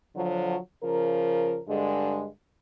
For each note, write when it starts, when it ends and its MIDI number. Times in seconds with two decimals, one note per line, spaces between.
0.15 0.56 50
0.15 0.56 53
0.15 0.56 54
0.83 1.60 49
0.83 1.60 53
0.83 1.60 70
1.69 2.26 43
1.69 2.26 50
1.69 2.26 56